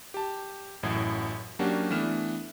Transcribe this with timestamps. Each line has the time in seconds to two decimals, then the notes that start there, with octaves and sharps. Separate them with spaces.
0.14 G4 A5
0.83 A1 F#2 A2 F#3 F#4 G#6
1.59 F#3 A#3 C#4 D4 F#4 G4
1.90 E3 A3 B3 D4 F6 E7